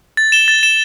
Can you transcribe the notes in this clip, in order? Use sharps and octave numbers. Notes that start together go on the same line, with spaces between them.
A6
E7 G7
A6
E7 G7